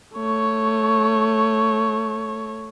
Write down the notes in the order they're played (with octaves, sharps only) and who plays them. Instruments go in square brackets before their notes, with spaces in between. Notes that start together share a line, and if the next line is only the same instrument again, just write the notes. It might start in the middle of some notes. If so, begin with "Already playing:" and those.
[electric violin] A3 C#5